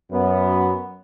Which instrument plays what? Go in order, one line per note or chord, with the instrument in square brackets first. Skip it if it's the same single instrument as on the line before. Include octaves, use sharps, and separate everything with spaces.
[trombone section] F#2 B3